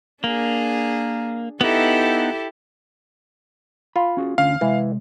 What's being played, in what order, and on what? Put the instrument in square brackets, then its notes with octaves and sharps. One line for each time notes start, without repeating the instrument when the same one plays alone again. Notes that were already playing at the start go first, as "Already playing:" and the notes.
[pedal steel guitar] A#3 [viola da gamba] D4 G#4
[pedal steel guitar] B3 D#4 [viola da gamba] E4 G4 A4
[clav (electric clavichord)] F4 [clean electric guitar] B5
[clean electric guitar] C#4 F#4 G#4
[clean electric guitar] D2 D3 C#4 [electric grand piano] F5
[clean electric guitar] C3 G#3 [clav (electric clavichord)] E3